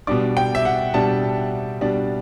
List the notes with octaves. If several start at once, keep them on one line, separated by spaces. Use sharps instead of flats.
B2 G3 D4 D6
G5
E5
F#5
B2 G3 D4 A5
B2 G3 D4